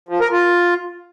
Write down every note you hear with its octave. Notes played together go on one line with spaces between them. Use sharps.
F3
A#4
F4